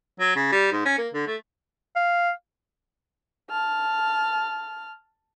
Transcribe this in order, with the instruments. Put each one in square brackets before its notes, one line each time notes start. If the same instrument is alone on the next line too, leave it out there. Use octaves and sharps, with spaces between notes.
[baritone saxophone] F#3
C#3
G3
G#2
C#4
A#3
D3
A3
[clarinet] F5
[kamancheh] A5 F6